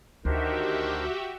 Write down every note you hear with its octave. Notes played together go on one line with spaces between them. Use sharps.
D2 D#3 D4 F#4 G4 A#4 C5 E5